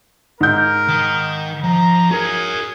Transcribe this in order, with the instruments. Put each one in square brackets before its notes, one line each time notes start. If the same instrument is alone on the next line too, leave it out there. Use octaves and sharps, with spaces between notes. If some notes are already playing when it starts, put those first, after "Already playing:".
[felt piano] G#2 G6 [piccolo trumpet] A#4
[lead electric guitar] D#3 A#5
[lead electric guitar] F3 [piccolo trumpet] A#5
[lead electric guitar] F#4 A#4 [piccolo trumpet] G#4